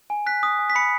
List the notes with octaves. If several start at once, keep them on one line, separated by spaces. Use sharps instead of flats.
G#5
F#6 B6
D#6
G#5
B6
B5 C#7